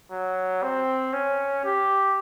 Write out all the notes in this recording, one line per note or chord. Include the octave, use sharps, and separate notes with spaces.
F#3
C4
C#4
G4